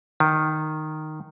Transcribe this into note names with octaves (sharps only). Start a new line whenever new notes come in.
D#3